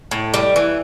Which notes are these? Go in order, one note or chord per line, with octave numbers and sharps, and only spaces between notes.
A2
G3
E3